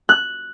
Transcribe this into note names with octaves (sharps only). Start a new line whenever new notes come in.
F#6